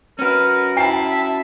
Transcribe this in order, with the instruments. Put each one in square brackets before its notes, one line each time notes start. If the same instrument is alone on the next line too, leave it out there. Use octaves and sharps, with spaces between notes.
[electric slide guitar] C#4 F#4 [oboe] A#4 [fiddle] B4
[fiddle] E4 A5 [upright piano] G5 A#5 C7
[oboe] E5